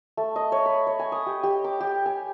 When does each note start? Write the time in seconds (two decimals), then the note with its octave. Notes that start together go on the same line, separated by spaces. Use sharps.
0.17 A3
0.36 D#5
0.52 C#5
0.66 B5
0.87 C#5
0.99 G#5
1.12 D#6
1.27 G4
1.43 G4
1.64 D6
1.80 G4
2.06 G#5